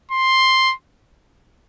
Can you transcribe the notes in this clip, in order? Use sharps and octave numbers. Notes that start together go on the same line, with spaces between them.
C6